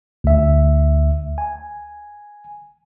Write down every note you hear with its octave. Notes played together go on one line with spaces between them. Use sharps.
D2 E5
G#5